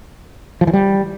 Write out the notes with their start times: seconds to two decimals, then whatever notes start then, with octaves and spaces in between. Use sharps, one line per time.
0.61 F3
0.67 E3
0.73 G3